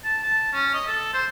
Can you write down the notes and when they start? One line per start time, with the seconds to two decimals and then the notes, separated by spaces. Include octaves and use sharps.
0.04 A5
0.23 A5
0.53 C#4
0.74 D#5
0.87 A4
1.14 C5